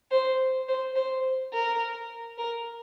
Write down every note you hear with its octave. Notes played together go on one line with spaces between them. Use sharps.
C5
C5
C5
A#4
A#4